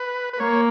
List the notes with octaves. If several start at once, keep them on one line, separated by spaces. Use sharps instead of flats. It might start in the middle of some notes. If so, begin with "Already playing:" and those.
Already playing: B4
B4
A#3 C#5